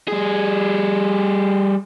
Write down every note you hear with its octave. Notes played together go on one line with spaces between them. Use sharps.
G3 G#4